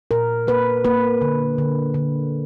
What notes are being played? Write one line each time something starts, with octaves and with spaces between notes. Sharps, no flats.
A#2 A#4
A#3 B4
A#3 B4
D3
D3
D3